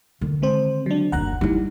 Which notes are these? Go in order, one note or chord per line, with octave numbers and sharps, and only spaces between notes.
D3 D#3
G#3 C4 C5
F#3 D4
F#1 D#2 F#5 A#5 F#6
G3 D#4 E4